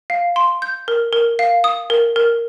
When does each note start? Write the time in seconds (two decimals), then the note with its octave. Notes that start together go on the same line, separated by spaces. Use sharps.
0.10 F5
0.36 C6
0.62 G6
0.88 A#4
1.13 A#4
1.39 F5
1.64 D#6
1.90 A#4
2.16 A#4